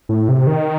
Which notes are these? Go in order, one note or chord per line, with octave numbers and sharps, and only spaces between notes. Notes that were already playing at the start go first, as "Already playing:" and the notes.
A2
C3
D#3